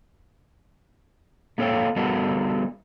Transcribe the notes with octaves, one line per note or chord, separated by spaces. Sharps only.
A3 A#3 A4 C#5 F5 G5
G3 B3 F#4 A4 A#4